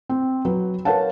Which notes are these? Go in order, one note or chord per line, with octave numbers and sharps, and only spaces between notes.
C4
F#3 B4
A#4 B4 C#5 F5 F#5 A5